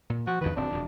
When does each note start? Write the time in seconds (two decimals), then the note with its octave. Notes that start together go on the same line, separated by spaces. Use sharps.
0.10 A#2
0.27 F3 F#4
0.41 E2 G2 D#3 B4
0.56 D1 C4 D4
0.72 E1 F2